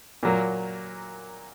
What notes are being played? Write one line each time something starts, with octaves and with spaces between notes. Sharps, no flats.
A#2 F#3 A#3